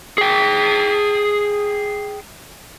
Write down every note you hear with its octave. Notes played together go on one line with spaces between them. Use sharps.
G#4 G5